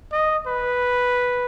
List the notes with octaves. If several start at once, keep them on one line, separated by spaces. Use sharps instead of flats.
D#5
B4